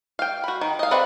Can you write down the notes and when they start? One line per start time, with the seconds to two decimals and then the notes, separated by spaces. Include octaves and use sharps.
0.19 F5 G5
0.44 F#4 B5
0.61 D#3
0.79 D#5 F5
0.91 C4 B4 D5 E5 F#5